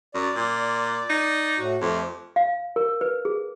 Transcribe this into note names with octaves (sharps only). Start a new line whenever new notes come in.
F#2 D5
A#2
D#4
A2 F#4
F2 A3 C4 G4
F5
A#4
B4
G#4